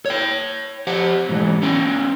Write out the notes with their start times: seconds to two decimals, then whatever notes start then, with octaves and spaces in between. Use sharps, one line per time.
0.06 C#5 G5
0.87 G4 C5 F#5
1.29 G#2 E3
1.62 B3 C#4 G5